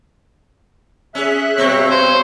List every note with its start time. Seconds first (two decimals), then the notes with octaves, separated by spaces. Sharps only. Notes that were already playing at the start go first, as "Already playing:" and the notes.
1.15 C#4 G#4 E5 F#6
1.58 G2 B2 C4 C#5
1.91 C5